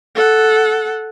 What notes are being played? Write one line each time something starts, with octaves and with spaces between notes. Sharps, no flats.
A4 F#5